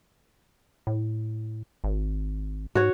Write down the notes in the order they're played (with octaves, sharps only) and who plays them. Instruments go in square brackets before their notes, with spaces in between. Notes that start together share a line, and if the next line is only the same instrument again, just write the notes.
[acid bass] A2
G#1
[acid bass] G#2 [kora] F#4 C#5